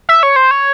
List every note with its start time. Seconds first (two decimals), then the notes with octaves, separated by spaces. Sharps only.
0.09 E5
0.23 C#5
0.36 C5
0.51 C#5